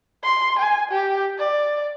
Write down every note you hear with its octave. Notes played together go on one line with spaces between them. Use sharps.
C6
G#5
G4
D5